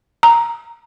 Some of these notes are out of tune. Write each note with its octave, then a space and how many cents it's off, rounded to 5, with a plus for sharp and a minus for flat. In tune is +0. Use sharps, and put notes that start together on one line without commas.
A#5 +0